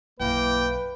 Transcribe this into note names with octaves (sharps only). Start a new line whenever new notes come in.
B1 F#2 E3 A#3 B4 G5